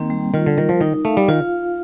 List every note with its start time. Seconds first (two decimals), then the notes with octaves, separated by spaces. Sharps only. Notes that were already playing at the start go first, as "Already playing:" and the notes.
Already playing: D#3 A#3 C4
0.10 G3
0.34 D#3 F4
0.46 D3
0.58 D#3 A#4
0.69 F3
0.81 D#3 D#4
1.05 A3 F5
1.17 G3
1.28 D#3 F4